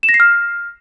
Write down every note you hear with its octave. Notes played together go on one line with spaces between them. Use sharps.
E7
A#6
C7
F6